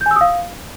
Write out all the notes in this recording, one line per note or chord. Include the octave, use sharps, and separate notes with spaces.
G6
G#5
E6
D#6
F5